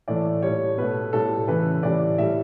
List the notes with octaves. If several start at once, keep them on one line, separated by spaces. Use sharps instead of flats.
A2 E3 A3 D5
A2 G3 C#5
B2 A3 B4
A2 G3 A4
C#3 E3 A3 B4
A2 E3 G3 D5
A2 G3 E5